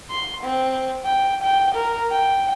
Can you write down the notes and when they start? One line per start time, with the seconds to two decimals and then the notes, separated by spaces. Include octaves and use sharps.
0.10 C6
0.43 C4
1.05 G5
1.42 G5
1.75 A#4
2.11 G5